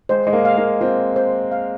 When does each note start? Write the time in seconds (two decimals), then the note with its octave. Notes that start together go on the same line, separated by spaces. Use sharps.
0.09 G#3 C5
0.27 G#3
0.33 A#3
0.45 F5
0.57 A#3
0.81 C4 F4
1.16 C5
1.52 F5